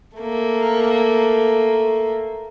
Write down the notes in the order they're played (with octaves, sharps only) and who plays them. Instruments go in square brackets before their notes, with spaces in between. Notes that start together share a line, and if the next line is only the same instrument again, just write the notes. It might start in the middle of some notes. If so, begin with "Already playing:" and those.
[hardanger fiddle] A3 A#3